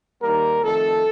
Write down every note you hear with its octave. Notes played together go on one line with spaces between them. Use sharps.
D#2 D#3 G3 A#3 A#4
F2 D#3 A3 A4